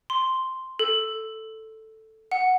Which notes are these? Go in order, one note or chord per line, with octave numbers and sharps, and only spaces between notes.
C6
A4
F#5